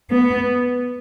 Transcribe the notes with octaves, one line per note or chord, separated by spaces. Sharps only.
B3